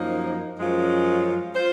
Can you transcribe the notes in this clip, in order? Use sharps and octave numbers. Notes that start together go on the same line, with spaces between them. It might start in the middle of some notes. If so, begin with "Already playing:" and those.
Already playing: F#2 F3 A#3 D#4
F#2 F3 G#3 C#4 F4
F4 C5